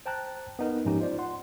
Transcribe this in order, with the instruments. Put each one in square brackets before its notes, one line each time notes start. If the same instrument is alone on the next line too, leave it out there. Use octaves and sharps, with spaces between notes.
[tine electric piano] C5 G5 A5 A#5 F#6
B3 D#4 A#4
G#2 F3 C#4 D#4 G4
F4 C5 D5
F#5 C6